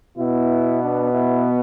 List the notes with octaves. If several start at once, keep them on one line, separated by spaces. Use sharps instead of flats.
B2 B3 E4
D4
E4